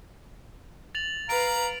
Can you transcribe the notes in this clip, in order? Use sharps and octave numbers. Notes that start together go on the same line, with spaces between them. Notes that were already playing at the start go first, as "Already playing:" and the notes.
A6 F7 F#7
B4 F5 A#5 D7